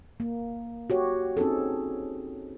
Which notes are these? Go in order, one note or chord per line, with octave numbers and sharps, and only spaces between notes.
A#3
F#4 G4 C#5
C4 C#4 D#4 G#4 A4